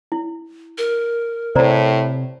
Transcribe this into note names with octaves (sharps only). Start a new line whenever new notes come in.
E4
A#4
A2 C3 C4 C5 D5 A#5